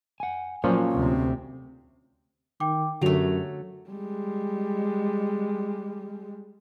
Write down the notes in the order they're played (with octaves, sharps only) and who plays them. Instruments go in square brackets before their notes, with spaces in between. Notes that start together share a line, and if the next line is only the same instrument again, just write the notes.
[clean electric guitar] F#5 G#5
[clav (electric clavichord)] A#2 F3 [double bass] F#3 [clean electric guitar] C#4 C5 C#5
[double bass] D2 C3
[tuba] D#3 [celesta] G5 D6
[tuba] F#2 [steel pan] D3 [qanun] F#3 A3 [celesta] G4 F7
[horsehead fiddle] G3 G#3